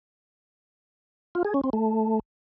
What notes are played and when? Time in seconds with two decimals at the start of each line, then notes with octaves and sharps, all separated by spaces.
1.35 F4
1.45 G#4
1.54 C#4
1.64 C4
1.73 A3